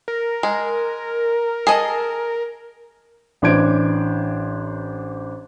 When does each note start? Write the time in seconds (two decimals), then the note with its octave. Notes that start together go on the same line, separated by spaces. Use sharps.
0.08 A#4
0.43 G#3
1.67 G#4 A4 D#5
3.42 A1 E3 D4 C5 G#6 D7